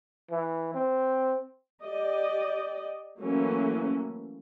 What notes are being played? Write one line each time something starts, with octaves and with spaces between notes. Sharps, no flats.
E3
C4
G4 D5 D#5
E3 F#3 A3 A#3 C#4